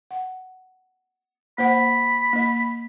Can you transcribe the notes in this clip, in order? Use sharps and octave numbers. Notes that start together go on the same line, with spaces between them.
F#5
A#3 C5 F#5 B5
A#3 D#5